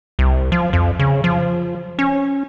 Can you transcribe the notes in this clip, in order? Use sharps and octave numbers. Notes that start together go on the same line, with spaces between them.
C2
F3
F2
C#3
F3
C#4